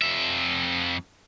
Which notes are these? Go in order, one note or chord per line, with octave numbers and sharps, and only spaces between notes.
F2 E5